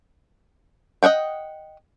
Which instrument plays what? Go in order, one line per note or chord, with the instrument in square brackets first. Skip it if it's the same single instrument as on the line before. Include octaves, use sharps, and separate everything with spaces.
[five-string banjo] D#5 E5 F#5 G5